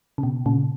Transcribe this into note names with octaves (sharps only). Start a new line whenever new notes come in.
C#3
B2
A#2 C#3